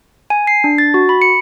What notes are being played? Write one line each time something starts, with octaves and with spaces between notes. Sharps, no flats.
G#5
C7
D4
A6
F#4
B5
C#7